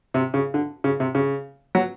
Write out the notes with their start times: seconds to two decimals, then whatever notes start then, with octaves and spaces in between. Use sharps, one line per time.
0.14 C3
0.34 C#3
0.54 D3
0.84 C#3
1.00 C3
1.15 C#3
1.75 F#3